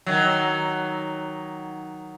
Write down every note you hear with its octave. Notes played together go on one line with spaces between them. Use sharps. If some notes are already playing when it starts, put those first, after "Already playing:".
D#3 F#3